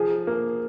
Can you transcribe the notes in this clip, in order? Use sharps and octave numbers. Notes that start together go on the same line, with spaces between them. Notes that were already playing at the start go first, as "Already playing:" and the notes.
Already playing: F3 G#4
A#3